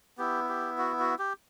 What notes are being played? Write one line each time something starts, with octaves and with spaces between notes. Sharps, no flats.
B3 E4 G4
G4
F#4
F#4
G4